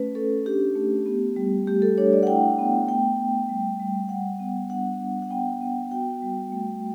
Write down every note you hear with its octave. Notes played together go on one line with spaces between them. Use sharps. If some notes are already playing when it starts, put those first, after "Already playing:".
Already playing: A3 C#4 B4
C#4 A4
D4 G4
A3
B3
G3
A3 G4
A4
D4 C#5
D5
F#5
E4 G5
B3
A3 G5
A3
G3
G3
G3 F#5
B3
D4 F#5
D4
F#5
B3 G5
B3
F#4 G5
G3
A3